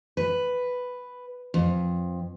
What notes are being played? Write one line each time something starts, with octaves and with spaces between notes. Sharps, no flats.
B4
F2